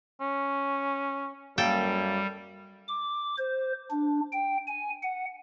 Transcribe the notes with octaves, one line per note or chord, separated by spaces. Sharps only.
C#4
F#2 G3 A#3 A4 G5
D6
C5
D4
G5
G#5
F#5